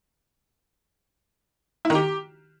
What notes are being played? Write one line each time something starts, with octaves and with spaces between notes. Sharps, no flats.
E4
D#3
G4